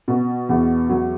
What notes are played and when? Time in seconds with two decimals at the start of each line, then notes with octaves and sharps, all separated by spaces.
0.08 B2
0.49 E2
0.89 F#3